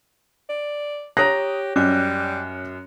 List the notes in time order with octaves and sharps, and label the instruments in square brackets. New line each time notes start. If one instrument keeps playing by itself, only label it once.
[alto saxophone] D5
[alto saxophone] G4 [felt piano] C#5 A#6 [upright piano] A#5 D#6 F#6
[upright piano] F#2 [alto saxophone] G3 [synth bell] C#4 F#6